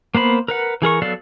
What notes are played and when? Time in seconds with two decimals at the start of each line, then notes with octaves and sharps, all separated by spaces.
0.15 A#3 B3 C5 B5
0.48 A#4 B4 F#5
0.82 E3 G#4 A#4 C#6
1.02 F#3 B3 A4 D5 F5